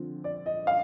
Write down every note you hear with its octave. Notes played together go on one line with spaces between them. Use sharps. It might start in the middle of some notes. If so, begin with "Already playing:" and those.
Already playing: D3 F3 C4
D5
D#5
F5